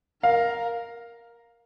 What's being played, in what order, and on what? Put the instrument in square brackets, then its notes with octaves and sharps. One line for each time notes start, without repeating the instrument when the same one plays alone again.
[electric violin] A#4 [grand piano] F5